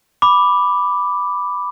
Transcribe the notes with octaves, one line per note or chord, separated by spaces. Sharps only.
B5 D6